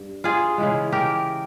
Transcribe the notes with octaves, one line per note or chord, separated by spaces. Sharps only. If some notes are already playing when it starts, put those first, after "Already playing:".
Already playing: G2
F4 G#4
C#3 E3 G#3
G4 A#4